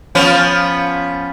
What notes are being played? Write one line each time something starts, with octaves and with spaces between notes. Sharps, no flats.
F3 B3 C#4